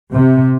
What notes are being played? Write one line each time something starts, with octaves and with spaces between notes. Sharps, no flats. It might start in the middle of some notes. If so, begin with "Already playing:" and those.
C3